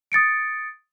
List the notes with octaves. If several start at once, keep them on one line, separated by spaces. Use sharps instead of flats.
D#6 A6 C#7 D7